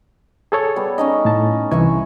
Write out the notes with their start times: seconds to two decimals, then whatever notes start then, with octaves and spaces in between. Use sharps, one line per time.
0.52 G#4 A4 C#5
0.76 G3 B3
0.98 C#4 D#4 D#5
1.25 A2 A5
1.71 C2 E3 B4 E5 G#5 C#6